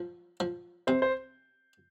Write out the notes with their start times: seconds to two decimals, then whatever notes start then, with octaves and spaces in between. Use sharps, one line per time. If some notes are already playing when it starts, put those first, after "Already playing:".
Already playing: F3
0.40 F3
0.87 C3 C5
1.02 C5